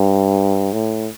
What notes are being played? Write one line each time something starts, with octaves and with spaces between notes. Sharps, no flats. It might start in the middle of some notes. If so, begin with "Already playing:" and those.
Already playing: G2
A2